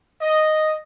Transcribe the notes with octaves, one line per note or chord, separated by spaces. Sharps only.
D#5